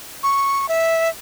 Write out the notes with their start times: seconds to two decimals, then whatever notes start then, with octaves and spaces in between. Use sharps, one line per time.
0.23 C#6
0.69 E5